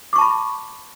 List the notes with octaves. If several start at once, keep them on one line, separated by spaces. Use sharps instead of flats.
A5 B5 C#6 D6